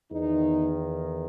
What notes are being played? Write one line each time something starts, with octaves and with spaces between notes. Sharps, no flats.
E2 D#3 D#4